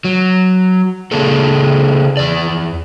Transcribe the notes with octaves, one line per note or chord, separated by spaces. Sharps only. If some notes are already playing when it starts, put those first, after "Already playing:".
F#3
C#3 A#3 D4 G#4 A4
E2 D5